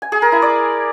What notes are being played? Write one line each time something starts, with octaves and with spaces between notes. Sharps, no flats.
G#5
G#4
A#4
E4
D5